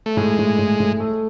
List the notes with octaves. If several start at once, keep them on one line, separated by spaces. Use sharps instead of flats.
A3
A2 G#3
A2
A2
A2
A3